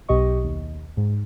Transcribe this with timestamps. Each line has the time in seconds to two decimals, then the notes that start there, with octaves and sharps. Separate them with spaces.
0.09 B1 B2 G4 D#5 C#6
0.44 D#2
0.97 G#2